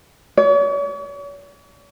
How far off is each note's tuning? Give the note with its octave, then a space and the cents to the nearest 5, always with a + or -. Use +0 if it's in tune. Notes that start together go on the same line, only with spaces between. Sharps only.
C#5 +40